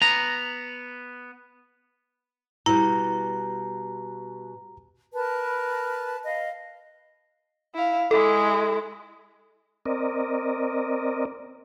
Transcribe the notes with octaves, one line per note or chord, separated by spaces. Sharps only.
B3 A#5
B2 G3 E4 A#5
A#4 B4 A5
D#5 F5
E4 F5
G#3 E4 A4
C4 A#4 D5 D#5